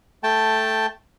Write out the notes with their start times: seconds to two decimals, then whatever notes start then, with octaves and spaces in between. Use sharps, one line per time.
0.23 A3 G5 A5